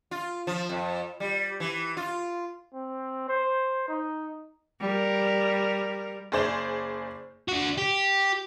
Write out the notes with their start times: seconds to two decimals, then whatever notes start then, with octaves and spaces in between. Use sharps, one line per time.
0.11 F4
0.47 F3
0.69 F2
1.20 G3
1.60 E3
1.97 F4
2.74 C4
3.28 C5
3.88 D#4
4.80 G3 A#4
6.32 F#1 G#4 C5 D5 G6 E7
7.48 D4 F#4
7.78 G4